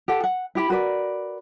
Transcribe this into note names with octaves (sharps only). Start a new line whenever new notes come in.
G4 A4 F#5
F#5
E4 G4 B5
F#4 A#4 B4 D5